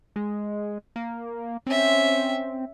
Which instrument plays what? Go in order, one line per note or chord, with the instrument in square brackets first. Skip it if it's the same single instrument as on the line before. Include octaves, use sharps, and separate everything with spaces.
[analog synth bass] G#3
A#3
[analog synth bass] C4 [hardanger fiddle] C#4 E5